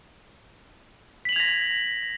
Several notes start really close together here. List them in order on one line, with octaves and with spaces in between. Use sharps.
B6 F#7 F7 G#6 A#6